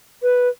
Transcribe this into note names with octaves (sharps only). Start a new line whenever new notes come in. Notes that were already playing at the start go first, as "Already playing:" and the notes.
B4